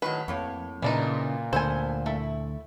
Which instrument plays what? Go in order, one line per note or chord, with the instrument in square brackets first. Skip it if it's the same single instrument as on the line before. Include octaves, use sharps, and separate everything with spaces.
[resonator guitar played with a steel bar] A2 D#3 F#3 [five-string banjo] B4
[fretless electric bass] F2 [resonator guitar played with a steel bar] A2 A#3 C#5
[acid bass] A#2 [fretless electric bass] C#3 [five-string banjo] E3 D4 D#4
[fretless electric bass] D2 D3 [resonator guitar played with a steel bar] B3 A4 [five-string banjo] C5 G#5
[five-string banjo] A3 [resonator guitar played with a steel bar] E4